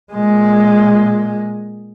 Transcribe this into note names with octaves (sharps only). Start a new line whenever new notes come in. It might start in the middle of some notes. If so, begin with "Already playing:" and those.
A#2 G#3